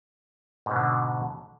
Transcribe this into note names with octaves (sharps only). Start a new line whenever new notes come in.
G#2 B2 D3